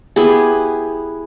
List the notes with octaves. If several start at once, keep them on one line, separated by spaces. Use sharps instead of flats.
B3 E4 G4 G#4